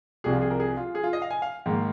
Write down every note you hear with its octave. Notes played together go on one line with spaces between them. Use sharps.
C2 C3 F3 G#4
F4
G#4
A#4
G#4
F4
G#4
F4
D#5
F5
G#5
F5
G#2 D#3 A#3